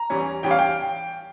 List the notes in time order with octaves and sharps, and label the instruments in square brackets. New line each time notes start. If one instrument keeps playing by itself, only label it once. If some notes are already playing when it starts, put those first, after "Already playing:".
Already playing: [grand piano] A#5
E2 E3 G3 C#4
E2 E3 G3 C#4 G5
F5
G5